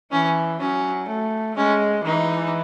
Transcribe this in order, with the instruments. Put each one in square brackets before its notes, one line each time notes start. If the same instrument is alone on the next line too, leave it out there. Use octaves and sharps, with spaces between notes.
[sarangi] E3 [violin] C#4
[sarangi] F#3 [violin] C#4
[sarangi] A3
[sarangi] G#3 [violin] C#4
[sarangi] E3 [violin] D#4